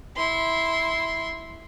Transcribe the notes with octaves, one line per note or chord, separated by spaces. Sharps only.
E4 C6